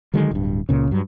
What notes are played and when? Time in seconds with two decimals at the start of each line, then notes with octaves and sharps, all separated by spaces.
0.14 D3 D#3 F#3 G#3
0.31 D1 G2
0.69 C#2 A#2 C#3
0.91 G2 F#3